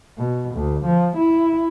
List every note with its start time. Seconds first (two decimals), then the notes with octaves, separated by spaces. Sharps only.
0.18 B2
0.55 D2
0.85 F3
1.17 E4